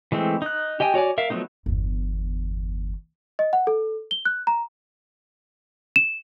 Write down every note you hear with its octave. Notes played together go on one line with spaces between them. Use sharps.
E3 G#3 A3 C4
D#4 F#6
G4 D#5 G5 G#5
F#4 C#5 D5 G#5
A#4 E5 F5
F3 F#3 A3 B3 D#4
G1 E2
D#5
F#5
A4
G7
F#6
A#5
E7